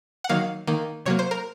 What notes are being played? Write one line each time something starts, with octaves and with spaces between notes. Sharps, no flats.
F#5
D#3 F#3 A#3 F5
D#3 A#3
C3 F#3 A#3 C#5
C5
A#4